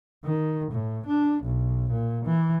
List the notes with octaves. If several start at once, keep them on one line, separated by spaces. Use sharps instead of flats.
D#3
A2
D4
B1
A#2
E3